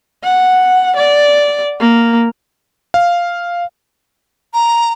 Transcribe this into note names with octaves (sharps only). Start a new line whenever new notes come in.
F#5
D5
A#3
F5
A#5